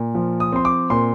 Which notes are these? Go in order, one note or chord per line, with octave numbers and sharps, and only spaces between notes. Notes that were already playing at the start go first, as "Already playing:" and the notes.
Already playing: A#2
F3
D#6
C4 C6
D6
A#2 C6